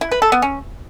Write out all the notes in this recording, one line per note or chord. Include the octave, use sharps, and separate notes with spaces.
E4
B4
A4
B3
C#4